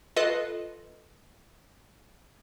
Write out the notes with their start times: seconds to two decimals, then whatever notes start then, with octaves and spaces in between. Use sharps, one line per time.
0.16 F4 A4 B4 D#5